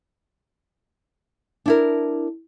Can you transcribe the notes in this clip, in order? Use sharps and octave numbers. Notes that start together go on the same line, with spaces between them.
D4 E4 A#4